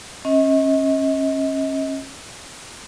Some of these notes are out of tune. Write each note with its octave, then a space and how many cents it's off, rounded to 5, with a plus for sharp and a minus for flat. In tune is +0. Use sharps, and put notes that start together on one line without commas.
C#4 -30 D#5 +35